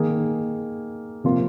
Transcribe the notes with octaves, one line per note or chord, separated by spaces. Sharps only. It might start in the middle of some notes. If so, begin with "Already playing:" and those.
Already playing: D#3 A#3 G#4
C3 F3 A#3 F4